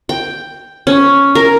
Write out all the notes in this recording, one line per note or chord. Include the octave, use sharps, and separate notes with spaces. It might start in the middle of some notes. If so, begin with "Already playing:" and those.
G5
C#4
A#4